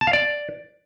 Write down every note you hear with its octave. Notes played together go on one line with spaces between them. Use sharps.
A5
F5
D5